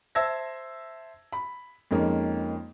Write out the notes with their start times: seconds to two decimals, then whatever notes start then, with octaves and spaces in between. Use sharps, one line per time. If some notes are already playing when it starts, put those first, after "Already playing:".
0.15 C5 E5 A5 E6 G#6 A#6
1.32 B5
1.91 F2 G#3 A#3 C#4 D#4